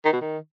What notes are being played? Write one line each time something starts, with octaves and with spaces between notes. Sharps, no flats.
D#3
B2
D#3